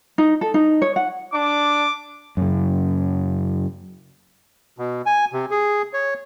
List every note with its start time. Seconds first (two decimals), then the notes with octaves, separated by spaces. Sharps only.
0.18 D#4
0.41 A4
0.54 D#4
0.82 C#5
0.96 F#5
1.34 D4 D6
2.37 F#2 C#3
4.78 B2
5.06 G#5
5.33 C3
5.51 G#4
5.93 C#5